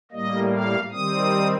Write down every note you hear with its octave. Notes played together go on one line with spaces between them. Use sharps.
A2 G3 A#3 D#5
F5
D#3 G3 C4 D#6